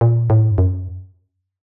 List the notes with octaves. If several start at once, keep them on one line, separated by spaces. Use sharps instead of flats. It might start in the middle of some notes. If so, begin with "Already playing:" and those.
A#2
A2
G2
F#2